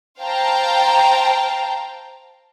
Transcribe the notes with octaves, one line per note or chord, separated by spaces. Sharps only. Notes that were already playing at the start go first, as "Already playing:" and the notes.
C5 F5 G5 A5 A#5